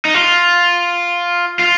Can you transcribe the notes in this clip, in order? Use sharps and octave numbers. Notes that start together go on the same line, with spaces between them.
D#4
F4
F4